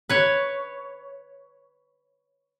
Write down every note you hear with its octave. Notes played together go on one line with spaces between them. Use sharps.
B4 C#5